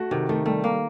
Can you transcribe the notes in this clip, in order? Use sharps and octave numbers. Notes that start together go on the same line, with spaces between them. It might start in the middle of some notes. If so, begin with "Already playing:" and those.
Already playing: A3 F#4
C3 D#3
D#3 A3
G3 A3
D#3 A#3